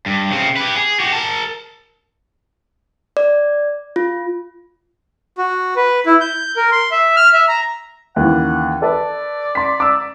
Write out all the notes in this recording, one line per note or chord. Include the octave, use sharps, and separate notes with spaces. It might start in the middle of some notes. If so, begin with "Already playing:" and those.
G2
C#3 C4
G4 B4
G#4
F#4 G4
A#4 A5
D5
F4
F#4
B4
E4
G6
A#4
C6
E5
F6
E5
A#5
D#2 C#3 E3 F#5
A4 B4 D5
C6 B6
D6 E6